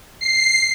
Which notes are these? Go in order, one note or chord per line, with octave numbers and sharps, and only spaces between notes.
C7